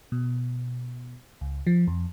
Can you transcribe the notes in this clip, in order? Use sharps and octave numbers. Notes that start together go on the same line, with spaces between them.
B2
C#2
F3
F2